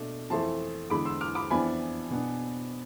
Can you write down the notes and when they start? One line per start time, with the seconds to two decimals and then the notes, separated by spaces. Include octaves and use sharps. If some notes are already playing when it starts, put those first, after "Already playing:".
Already playing: B2 A3 D4
0.30 F2 E3 A3 A5 C6
0.90 E2 D3 G#3 B5 D6
1.05 C6 E6
1.21 D6 F6
1.35 B5 D6
1.50 F2 E3 B3 D4 G#5 B5
2.10 B2 B3 D4